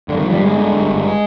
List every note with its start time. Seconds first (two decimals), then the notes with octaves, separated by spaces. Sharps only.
0.08 G2 D3
0.16 D#3
0.25 G1 F3
0.33 G3
0.41 G1 G#3
0.57 D3
0.73 G2
0.88 G1